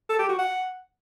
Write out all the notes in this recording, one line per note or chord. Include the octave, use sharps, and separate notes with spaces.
A4
G4
F#4
F#5